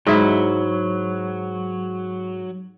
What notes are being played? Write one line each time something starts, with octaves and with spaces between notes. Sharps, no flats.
G#2 F#3 E4